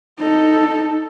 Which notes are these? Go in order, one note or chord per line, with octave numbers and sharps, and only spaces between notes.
D#4 A4